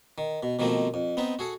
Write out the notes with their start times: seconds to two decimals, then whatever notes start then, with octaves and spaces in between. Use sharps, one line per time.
0.18 D#3
0.43 B2
0.59 B2 D#3 F3 A3 A#3 C4
0.94 F2
1.17 B3 C4 D#4 B4
1.39 F#4 G#4 A4